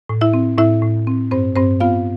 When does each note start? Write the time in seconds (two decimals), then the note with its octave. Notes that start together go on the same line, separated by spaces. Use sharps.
0.09 A2
0.21 E4 E5
0.33 C4
0.58 A2 E4 E5
0.82 A2
1.07 C4
1.31 G2 C4 C5
1.56 G2 C4 C5
1.80 B3 F4 F5